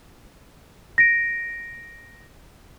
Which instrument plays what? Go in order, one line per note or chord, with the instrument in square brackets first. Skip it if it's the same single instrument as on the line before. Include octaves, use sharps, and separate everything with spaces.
[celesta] A#6 D7